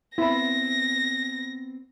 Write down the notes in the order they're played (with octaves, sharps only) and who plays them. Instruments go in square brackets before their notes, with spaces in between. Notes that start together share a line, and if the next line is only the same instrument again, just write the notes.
[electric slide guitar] B3 C4 [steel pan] E4 B5 [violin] A#6